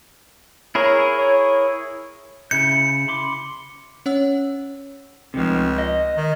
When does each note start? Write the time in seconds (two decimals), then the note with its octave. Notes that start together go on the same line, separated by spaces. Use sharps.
0.75 E4 G#4 A#4 C#5
1.18 C#5
2.51 C#3 E4 G6 C#7
3.08 B5 C6 D6
4.06 C#4 C#5 F#5 E6
5.34 C#2 C3 F3
5.78 D#5
6.17 D#3